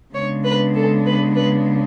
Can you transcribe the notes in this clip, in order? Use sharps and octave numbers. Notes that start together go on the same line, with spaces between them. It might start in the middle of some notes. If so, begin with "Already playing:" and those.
C#3 G#3 B3 D4 C#5
B4
A4
B4
B4